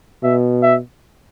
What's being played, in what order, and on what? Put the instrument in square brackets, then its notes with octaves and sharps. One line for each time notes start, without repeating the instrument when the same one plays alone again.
[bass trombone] B2 [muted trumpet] E5
[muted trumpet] E5